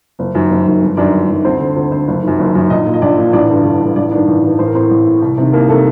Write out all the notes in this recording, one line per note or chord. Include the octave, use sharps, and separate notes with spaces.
F#1
F#2 D#3
F#1
F#2 D#3
G1
F#2 D#3 D4 D5
G1
F#2 D#3
D2 C4 C5
D3
D2
D3 C4 C5
F#1
F#2 D#3
F#1
F#2 D#3
A#1 D#4 D#5
A#2
D#5
A#1 D4 D5
A#2
A1 D4 D5
G2 D3
A1
G2 D3
A1 D4 D5
G2 D#3 D4 D5
A1
G2 D#3
A1 C5
A#4
A2 C4 C5
A1
A2
C2
C3 D#3
C2 A#3 A#4
C3 D#3 A3 A4